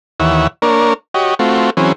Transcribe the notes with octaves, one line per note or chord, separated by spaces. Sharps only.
D#2 E3 C#5 E5 F#5
A#3 D4 A#4 C#5
F#4 G4 C#5 D#5
A3 C4 F4 F#4
E3 F#3 C4 C#4 G#4